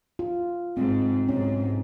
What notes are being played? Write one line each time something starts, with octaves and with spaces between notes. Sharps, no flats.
F4
G#2 C4
B1 G#2 C#4